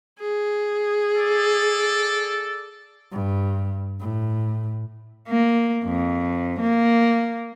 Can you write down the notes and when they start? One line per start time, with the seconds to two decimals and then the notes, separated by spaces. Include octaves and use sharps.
0.20 G#4
1.15 A4 D5
3.12 G2
4.00 A2
5.28 A#3
5.85 F2
6.60 A#3